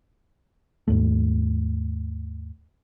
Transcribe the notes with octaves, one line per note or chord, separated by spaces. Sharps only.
D#2 G#2 A3